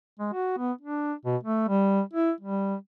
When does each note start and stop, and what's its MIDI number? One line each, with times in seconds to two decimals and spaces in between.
0.19 0.30 56
0.33 0.57 66
0.57 0.72 59
0.81 1.13 62
1.25 1.36 47
1.43 1.65 57
1.69 2.01 55
2.13 2.31 64
2.41 2.75 55